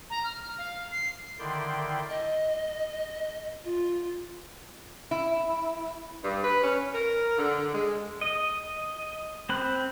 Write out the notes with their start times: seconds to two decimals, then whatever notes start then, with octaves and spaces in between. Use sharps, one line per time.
0.10 A#5
0.24 F6
0.58 F5
0.91 C7
1.39 D3 D#3 E4 D5 G5 C6
2.09 D#5
3.64 F4
5.11 E4
6.24 G2
6.44 B4
6.64 C#4
6.94 A#4
7.38 D3
7.74 G#3
8.21 D#5
9.49 C4 B5 F#6